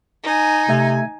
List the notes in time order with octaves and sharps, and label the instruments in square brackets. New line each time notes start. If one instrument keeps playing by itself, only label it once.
[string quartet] D#4 G#5
[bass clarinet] C3 [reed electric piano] A3 E5 G#6